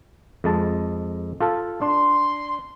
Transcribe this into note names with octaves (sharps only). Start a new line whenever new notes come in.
F2 G#3 A5
F4 A4 A5
D4 C6